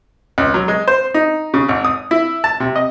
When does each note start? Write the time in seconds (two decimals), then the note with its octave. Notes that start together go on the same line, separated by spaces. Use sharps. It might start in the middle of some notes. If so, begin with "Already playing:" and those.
0.38 C#2
0.54 F#3
0.68 G#3
0.88 C5
1.14 D#4
1.54 C#3
1.69 G#1
1.85 D#6
2.11 E4
2.44 A5
2.60 C3
2.76 D#5